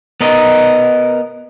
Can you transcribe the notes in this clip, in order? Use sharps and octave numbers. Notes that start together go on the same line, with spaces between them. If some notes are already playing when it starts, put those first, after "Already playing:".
B3 A#4 D#5